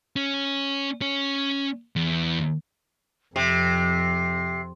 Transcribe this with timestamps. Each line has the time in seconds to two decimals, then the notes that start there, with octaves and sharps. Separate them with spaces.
0.16 C#4
1.01 C#4 C#5
1.96 E2
3.36 F2 C3 C7